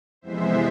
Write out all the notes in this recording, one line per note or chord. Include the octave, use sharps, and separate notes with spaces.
F2 C3 E3 G#3 B3 C5 E5